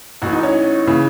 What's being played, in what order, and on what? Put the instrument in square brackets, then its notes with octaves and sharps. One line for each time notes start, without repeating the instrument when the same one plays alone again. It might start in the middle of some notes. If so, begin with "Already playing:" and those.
[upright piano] A1 A2 E3 F#4
D#4
C#4
C#3 E3